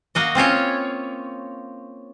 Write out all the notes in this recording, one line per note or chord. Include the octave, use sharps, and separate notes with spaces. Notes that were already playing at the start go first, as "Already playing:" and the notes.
A#3 F#4 D#5
C4 C#4 F4 C#5